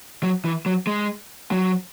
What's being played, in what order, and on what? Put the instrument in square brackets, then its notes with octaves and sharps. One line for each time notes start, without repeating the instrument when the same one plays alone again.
[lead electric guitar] F#3
E3
F#3
G#3
F#3